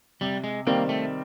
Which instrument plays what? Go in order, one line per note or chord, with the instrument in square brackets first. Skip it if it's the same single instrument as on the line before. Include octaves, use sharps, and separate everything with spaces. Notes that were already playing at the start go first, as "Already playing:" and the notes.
[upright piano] C3 [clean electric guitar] G3
[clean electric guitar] G#3
[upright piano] D#3 G3 C4 [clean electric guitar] A#3
[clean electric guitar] A3